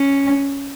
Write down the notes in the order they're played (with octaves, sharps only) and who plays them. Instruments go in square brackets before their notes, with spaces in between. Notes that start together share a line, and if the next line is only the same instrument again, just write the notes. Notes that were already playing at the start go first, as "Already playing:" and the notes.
Already playing: [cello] C#4